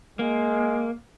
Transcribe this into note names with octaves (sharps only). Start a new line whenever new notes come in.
G#3 A#3